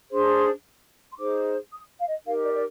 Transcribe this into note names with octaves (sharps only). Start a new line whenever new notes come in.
D4 G#4 C5 C6
C6
D#4 G#4 C5 D6
D#6
F5
D#5
D#4 G4 A#4 F5
D5
D5